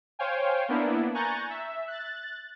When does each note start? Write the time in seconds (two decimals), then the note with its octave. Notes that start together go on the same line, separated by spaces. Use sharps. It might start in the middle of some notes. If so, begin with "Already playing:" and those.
0.19 C5 C#5 F5 G5 G#5
0.69 A#3 B3 D4 E4
1.14 G#5 A#5 C#6 F#6 G6 A6
1.50 E5
1.88 F#6 A6